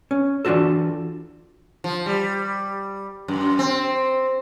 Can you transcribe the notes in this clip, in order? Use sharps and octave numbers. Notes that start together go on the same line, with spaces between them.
C#4
E3 D4 F4 F#4 A4
F3
G3
F#2
C4